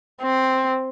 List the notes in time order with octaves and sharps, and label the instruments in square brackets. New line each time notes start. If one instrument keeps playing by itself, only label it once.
[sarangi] C4